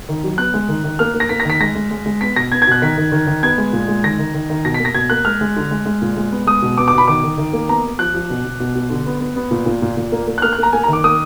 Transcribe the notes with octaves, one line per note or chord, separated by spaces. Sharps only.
D#3
F#3
B3 F#6
G#3
D#3
D#3
A#3 F6
A#3
A#6
A#3 B6
A#6
D#3 B6
G#3 A#6
G#3
G#3
G#3
B3 B6
B2 A#6
B3 G#6
G#6
B2 F#6
D#3 B6
D#3
D#3
D#3
B3 G#6
G#3
A#2
G#3
D#3 A#6
D#3
D#3
D#3
B2 A#6
B6
A#3
A#6
B2 G#6
A#3 F#6
G#3 F6
G#3
D3
G#3
G#3
A#2
G#3
B3
G#3 D#6
B2
B3 D6
D6
B2 B5
D#3 D6
D#3
D#3
A#3
B3 A#5
B3
F3 F#6
F3
B2
B2
B2
B2
D3
B3
B3
B3
A#2
A#2
A#2
A#2
A#3
A#3
F#6
A#3 F6
F#6
A#3 A#5
A#3 G#5
A#5
D#3
D6
A#3 D#6